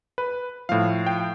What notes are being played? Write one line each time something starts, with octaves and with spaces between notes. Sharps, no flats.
B4
A2 F3 F5
G5